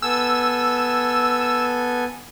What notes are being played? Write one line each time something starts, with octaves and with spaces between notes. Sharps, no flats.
B3 A4 G#5 E6